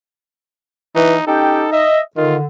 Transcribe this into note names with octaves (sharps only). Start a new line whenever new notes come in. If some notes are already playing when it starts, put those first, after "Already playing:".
E3 D#4
C#4 D#4 G4 A4 G5
D#5 E5
D3 D#3 F4